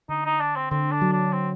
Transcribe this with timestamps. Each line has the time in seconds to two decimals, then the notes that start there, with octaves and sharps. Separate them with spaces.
0.09 D3 D#4
0.25 D#4
0.40 D4
0.56 C4
0.71 D3 C4
0.92 D4
1.02 F#3
1.12 D4
1.33 C4